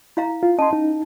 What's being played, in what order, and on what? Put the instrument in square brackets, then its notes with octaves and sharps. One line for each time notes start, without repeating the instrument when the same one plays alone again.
[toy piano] E4 F5 A#5
[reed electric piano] F4
[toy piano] C#4 A5 [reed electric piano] D#5 C6
[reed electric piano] D#4